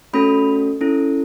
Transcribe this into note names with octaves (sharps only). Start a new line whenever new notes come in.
A3 C#4 F#4 A4 B5
C#4 E4 A4